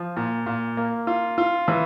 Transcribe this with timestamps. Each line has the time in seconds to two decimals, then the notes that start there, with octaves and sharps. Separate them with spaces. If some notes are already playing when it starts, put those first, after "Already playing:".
Already playing: F3
0.17 A#2
0.46 A#2
0.77 A#3
1.07 F4
1.38 F4
1.68 E3